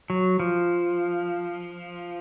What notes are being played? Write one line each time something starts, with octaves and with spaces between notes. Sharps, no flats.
F#3
F3